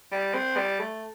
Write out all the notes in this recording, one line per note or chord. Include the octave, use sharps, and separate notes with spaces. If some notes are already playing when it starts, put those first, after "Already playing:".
G3
C4
G3
A3